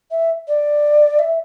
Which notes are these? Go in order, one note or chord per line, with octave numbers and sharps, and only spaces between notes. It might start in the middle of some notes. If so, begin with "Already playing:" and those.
E5
D5
E5